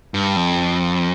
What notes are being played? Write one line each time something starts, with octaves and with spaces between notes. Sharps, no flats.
G2
F2